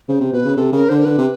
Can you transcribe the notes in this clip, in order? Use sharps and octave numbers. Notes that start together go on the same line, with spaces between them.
C#3 C5
C3
B2 B4
C#3
C3 A4
C#3 A#4
D3 C5
A#4
D3 B4
C3